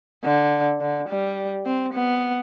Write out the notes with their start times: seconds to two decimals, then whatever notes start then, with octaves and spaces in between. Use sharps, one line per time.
0.24 D3
0.81 D3
1.09 G3
1.66 C4
1.94 B3